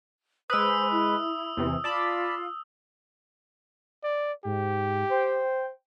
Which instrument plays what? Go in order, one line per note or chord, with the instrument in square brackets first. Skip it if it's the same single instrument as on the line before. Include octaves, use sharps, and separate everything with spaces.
[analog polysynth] G#3 B4 [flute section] C5 [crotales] D#6 E6
[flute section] E4
[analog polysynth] E2 C3 E3
[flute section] F4 [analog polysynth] D5 A5 B5
[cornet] D5
[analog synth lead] G#2 [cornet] G4
[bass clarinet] C5 [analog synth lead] G5